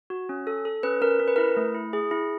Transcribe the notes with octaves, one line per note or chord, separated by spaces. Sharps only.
F#4
C#4
A4
A4
C#4 B4
C#4 A#4
C#4 A#4
B4
E4 A#4
A3
E4
G#4
E4